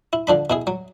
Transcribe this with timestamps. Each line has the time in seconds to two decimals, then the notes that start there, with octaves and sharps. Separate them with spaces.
0.13 E4
0.27 D3 F3 D4 B5
0.50 B2 E4 G#4
0.67 F#3